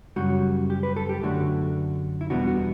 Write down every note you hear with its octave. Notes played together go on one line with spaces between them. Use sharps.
F#2 C#3 G3 F#4
G4
B4
A4
G4
F#2 D3 A3 D4 F#4
E4
E2 B2 G3 B3 D4 F#4
F#4